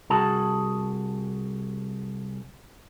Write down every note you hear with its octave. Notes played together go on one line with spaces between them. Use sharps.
C2 F#4 G#4 A5